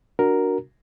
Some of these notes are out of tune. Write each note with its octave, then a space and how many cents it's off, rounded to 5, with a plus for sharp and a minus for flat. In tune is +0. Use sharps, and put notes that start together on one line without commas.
D4 +0 F#4 +0 A#4 +0